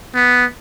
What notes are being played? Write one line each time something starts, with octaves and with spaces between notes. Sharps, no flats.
B3